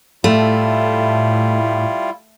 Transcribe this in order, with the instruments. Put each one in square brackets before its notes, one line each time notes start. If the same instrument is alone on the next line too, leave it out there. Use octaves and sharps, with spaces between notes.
[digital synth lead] A2 [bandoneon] G3 E4 F4 [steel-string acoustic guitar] A3